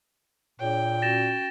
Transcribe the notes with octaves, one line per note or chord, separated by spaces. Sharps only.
A#2 D4 G#4 C#5 G5
C#4 F#4 A6 A#6 E7